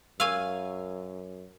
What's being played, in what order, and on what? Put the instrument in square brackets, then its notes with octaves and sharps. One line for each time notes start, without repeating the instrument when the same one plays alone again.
[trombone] F#2 [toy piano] A#4 C#6 E6 [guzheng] F5 G#5